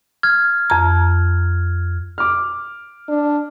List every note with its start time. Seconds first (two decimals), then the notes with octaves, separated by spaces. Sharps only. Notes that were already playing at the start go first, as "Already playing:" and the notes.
0.23 F6 G#6
0.70 F2 A#5
2.18 D6 F6
3.08 D4